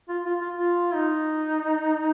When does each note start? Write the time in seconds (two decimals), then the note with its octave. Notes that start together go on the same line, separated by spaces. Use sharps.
0.09 F4
0.25 F4
0.41 F4
0.58 F4
0.95 D#4